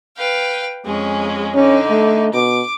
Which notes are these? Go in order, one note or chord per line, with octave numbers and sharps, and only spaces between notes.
B4 F5 G5
F2 G#3 C#4
D3 C#4 D#4
A3
B2 D6